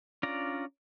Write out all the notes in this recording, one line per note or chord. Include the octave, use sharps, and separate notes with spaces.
C#4 D4 F4 D5 A#5